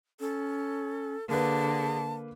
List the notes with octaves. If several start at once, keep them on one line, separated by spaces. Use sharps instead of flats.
C#4 A4
D3 A#3 G#4 B4 A5